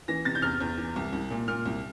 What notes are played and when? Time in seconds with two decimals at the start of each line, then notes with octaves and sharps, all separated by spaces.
0.08 E3 A#6
0.25 C3 A6
0.35 G6
0.42 E2 F6
0.60 E2
0.78 E3
0.96 C2
1.13 C2
1.31 A#2
1.48 A#2 F6
1.65 C2